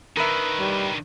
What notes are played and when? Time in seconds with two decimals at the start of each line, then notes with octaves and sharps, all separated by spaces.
0.17 D3 D#3 A#4 B4 E5
0.59 G3